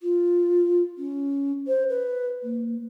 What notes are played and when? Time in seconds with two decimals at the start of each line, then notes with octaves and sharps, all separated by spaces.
0.01 F4
0.98 C#4
1.67 C5
1.89 B4
2.43 A#3